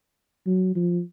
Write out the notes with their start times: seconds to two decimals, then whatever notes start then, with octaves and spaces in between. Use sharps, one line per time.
0.47 F#3
0.76 F3